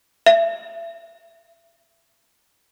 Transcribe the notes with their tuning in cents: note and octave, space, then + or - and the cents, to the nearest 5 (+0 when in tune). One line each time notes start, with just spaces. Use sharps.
E5 +30